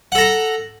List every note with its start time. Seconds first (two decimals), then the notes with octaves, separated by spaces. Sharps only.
0.12 F#5
0.15 A4
0.18 A#5